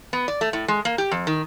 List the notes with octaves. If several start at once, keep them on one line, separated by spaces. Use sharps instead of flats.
B3
D5
A3
A2
G#3
A#3
G4
F2
D#3